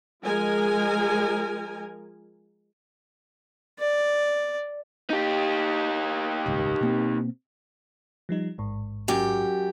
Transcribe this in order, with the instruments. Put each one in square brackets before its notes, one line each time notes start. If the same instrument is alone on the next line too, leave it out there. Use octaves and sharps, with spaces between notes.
[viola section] F3 G#3 A#4 G#5
[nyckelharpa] D5
[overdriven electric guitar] D#4 G4
[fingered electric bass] D#1 G#1 C#2
B2 A#3 C4
[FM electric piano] F3 G3 D#4
A1 G#2
[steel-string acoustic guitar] F#2 G4